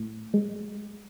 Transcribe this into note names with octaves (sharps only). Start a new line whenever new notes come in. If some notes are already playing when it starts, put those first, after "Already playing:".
Already playing: A2
G#3